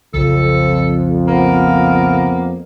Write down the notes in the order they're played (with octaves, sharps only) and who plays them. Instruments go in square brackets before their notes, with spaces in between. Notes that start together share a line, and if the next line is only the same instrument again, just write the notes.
[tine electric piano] B1 C#3 [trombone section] F2 [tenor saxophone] A4
[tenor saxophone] A#3 [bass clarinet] B3